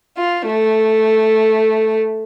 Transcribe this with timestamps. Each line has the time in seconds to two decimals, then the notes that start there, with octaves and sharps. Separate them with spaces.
0.17 F4
0.46 A3